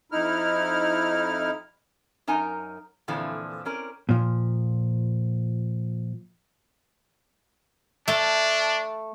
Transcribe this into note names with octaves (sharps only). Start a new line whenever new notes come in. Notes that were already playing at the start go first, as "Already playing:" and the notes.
F2 D#4 E4 F6
F#2 D#4 A#4 G#5 A#5
F2 A#2 D3 E3 F3
C4 C#4 A#4 D5
A#2 F3
A3 D4